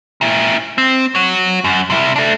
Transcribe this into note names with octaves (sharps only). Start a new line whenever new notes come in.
A#2 E4
C4
F#4 C#5
F#2
C3 E4
A3 D4